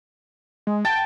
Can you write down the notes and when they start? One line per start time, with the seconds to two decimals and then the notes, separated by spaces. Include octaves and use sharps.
0.67 G#3
0.85 G5 A5